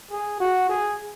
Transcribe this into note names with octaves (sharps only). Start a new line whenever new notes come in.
G#4
F#4
G#4